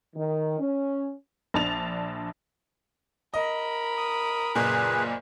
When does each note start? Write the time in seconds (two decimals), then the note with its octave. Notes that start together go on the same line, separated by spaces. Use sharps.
0.16 D#3
0.59 C#4
1.54 A#1 D4 A5 A6 F7
3.34 A#4 D#5 B5
3.97 D#6
4.55 F#1 A#2 G#4 B4